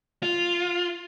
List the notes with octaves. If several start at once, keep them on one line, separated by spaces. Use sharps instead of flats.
F4